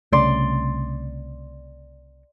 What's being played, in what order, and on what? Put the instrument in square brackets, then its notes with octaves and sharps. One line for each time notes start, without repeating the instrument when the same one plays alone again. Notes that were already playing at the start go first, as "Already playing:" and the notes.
[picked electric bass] C2 C#3 A3 [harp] D5 C6